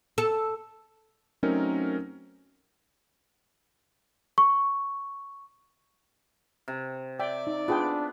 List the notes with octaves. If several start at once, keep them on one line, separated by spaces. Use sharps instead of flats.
A4
F#3 A3 C4 C#4 D#4 A#4
C#6
C3
D5 E5 G5
D#4
B3 D4 F4 G#4 G5